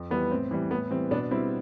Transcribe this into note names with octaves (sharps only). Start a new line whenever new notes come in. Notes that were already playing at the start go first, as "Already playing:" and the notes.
Already playing: F2
E3 G3 B3
A2 C4
E3 G3
A2 B3
E3 G3 C4
B2 B3 D4
G3 C4 E4